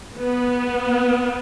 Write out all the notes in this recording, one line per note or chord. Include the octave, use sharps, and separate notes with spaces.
B3